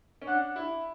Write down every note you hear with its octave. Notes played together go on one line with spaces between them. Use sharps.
C#4
D4 F#5
E4